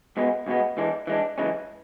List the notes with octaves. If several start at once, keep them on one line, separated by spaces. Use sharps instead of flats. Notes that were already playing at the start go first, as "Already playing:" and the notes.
C#2 B2 G#3 B3
C#2 B2 G#3 B3
E3 G#3 D4
E3 G#3 D4
F#2 C#3 E3 G#3 C#4